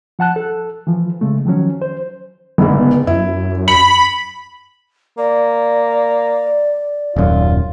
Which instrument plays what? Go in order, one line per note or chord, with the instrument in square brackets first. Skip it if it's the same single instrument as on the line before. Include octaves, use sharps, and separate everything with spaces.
[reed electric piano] F3 F#5 A5 F#6
A4
E3 F3
C#3 G#3 A3
D#3 F3 F#3 C#4
C5
[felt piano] F#1 G#2 D3 [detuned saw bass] B3
[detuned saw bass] F#2 [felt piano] E4
[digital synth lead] B5 [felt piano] C#7
[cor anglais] A#3 [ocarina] D5
[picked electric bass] D#1 F#2 [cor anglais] F4